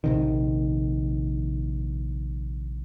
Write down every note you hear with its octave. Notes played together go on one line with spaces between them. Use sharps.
A#1 C3 D#3